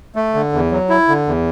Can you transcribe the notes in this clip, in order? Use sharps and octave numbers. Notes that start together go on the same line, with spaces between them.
A3
D3
E2
F#3
E4
D3
E2